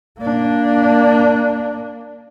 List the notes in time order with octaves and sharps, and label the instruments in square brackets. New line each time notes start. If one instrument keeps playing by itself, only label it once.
[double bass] A#3 D4